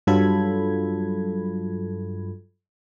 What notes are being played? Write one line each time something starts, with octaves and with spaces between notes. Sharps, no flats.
G2 F#3 F4 A4 B5 G#6